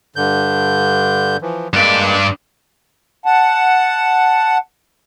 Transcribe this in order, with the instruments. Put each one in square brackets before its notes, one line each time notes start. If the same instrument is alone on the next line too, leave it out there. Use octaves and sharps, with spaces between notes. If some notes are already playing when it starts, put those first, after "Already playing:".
[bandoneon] G2 D3 G6
E3 F3
[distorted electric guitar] G2 D5 [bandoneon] G#3 A#3
[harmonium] F#5 A5